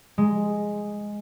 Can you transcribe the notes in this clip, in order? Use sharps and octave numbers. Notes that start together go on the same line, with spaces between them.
G#3